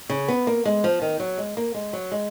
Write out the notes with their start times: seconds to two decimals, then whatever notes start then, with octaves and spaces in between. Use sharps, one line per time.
0.09 C#3
0.28 B3
0.47 A#3
0.65 G#3
0.84 F3
1.02 D#3
1.20 F#3
1.38 G#3
1.57 A#3
1.74 G#3
1.93 F#3
2.12 G#3